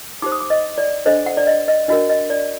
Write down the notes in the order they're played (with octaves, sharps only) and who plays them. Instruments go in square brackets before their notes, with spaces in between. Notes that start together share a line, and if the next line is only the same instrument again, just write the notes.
[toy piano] D#4 G4 C5 D6
D#6
D6
D#5
D5
D4 A4 C5 D#5
F#5
D5
D#5
D#5
D4 F#4 A#4 D#5
D#5
D5